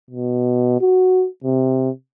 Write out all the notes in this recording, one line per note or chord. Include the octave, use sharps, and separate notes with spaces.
B2
F#4
C3